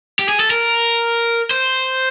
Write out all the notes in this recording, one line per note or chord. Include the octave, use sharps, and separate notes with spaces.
G4
G#4
A4
A#4
C5